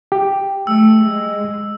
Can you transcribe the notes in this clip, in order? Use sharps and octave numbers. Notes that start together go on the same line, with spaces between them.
G4
A3 E6
G#3